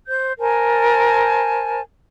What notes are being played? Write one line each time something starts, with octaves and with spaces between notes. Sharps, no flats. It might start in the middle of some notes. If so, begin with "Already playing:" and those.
C5 G6
A#4 C5 G#5 A5